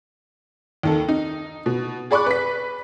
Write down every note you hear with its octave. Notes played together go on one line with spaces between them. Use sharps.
D#2 D#3 A4
D#4
B2
G#4 D5 B5 C#6 D6 F#6
B4 B6